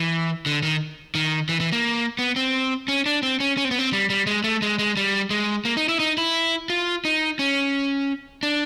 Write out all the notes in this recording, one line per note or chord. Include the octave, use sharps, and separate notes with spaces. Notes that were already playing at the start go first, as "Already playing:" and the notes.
Already playing: E3
D3
D#3
D#3
E3
E3
A#3
B3
C4
C#4
D4
C4
C#4
C#4
C4
B3
C4
G3
G3
G#3
A3
G#3
G#3
G3
G#3
A#3
D#4
E4
D#4
E4
F4
D#4
C#4
D4